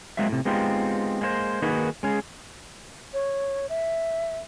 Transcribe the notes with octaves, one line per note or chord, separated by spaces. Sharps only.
F#3 G#3 A#3 C4 E5
A2 C3
G#3 B3 C4 D#4 F4 G4
G#3 A#3 E4 C5
D#3 A#3 D#4 F#4 G#4 B4
G#3 C#4 G#4
C#5
E5